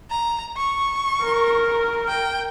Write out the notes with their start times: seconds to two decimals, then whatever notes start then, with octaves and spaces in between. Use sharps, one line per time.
0.10 A#5
0.56 C#6
1.23 A#4
2.08 G5